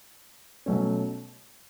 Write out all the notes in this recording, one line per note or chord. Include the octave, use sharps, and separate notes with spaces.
B2 F#3 A3 C#4